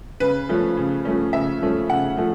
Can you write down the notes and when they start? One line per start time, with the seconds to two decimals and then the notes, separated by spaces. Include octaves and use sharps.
0.20 C#3 B4
0.49 F3 A3 C#4
0.77 C#3
1.05 F3 A3 C#4
1.33 C#3 E5
1.61 F3 A3 C#4
1.89 C#3 F#5
2.17 F3 A3